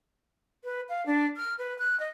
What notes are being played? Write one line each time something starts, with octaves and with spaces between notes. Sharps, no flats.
B4
F5
D4
F6
B4
F#6
D#5